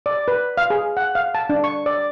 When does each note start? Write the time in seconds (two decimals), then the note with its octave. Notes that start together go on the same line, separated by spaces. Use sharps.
0.06 D5
0.28 B4
0.57 F5
0.70 G#4
0.97 F#5
1.15 F5
1.35 A5
1.50 D4
1.64 C#6
1.86 D5